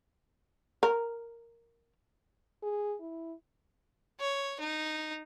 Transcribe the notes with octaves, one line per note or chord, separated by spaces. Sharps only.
A#4
G#4
E4
C#5
D#4